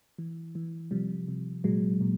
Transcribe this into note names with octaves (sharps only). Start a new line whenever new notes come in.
E3
E3
C3 F3 G3
C3
A#2 F#3 G#3
A#2